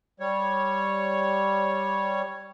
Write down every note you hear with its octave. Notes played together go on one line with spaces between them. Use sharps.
G3 C#5